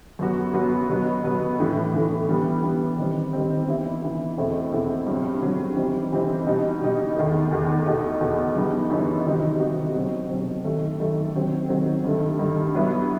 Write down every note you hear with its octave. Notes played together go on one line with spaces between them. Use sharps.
F#2 F#3 B3 F#4
F#2 F#3 B3 F#4
B2 F#3 B3
B2 F#3 B3
A2 E3 A3
A2 E3 A3
E3 G3 B3
E3 G3 B3
D#3 G3 C4
D#3 G3 C4
E3 B3 E4
E3 B3 E4
E2 B2 A3 C4 E4
E2 B2 A3 C4 E4
G2 F#3 C4
G2 F#3 C4
E3 G3 C4 D#4
E3 G3 C4 D#4
B2 G3 D#4
B2 G3 D#4
E2 D#3 A3
E2 D#3 A3
E2 B2 A3 D#4
E2 B2 A3 D#4
F#2 E3 G3 B3 D#4
F#2 E3 G3 B3 D#4
C3 D#3 G3 D#4 F#4
C3 D#3 G3 D#4 F#4
B2 F#3 C4
B2 F#3 C4
F#2 D#3 A3
F#2 D#3 A3
D#3 F#3 C4
D#3 F#3 C4
G2 D#3 A3
G2 D#3 A3
G2 F#3 B3 E4